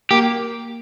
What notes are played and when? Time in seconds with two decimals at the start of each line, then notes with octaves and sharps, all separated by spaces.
0.11 A#3 G4